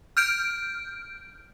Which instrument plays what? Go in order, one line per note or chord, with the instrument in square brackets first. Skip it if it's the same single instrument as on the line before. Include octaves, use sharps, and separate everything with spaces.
[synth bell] F6 G6 D7